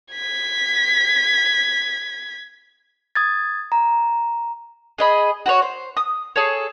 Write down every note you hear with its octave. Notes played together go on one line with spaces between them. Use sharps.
G#6 B6
D#6 G#6 A6
A#5
G#4 D#5 B5
F#4 B4 C#5
C5
D#6
G#4 A4 C#5